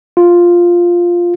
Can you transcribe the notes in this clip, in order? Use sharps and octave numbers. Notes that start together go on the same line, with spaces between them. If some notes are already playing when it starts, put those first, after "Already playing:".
F4